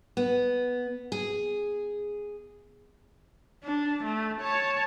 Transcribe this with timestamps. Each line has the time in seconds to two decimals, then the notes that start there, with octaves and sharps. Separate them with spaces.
0.17 B3
1.12 G#4
3.64 D4
4.03 A3
4.41 C#5 A5